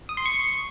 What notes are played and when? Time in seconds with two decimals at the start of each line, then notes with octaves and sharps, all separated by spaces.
0.09 D#6
0.17 C6
0.26 C#6